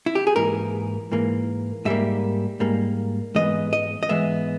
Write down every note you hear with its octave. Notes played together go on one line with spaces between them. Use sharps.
E4
G4
G#4
G#2 E3 A#3 A#4
G#2 E3 A#3
G#2 G3 A#3 E5
G#2 G3 A#3
G#2 E3 G#3 B3 D#5
D#5
D#5
G#2 E3 G#3 B3 E5